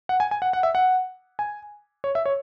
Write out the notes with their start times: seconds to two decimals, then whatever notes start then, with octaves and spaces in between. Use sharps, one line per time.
0.09 F#5
0.20 G#5
0.31 G#5
0.42 F#5
0.53 F#5
0.63 E5
0.75 F#5
1.39 G#5
2.04 C#5
2.15 E5
2.26 C#5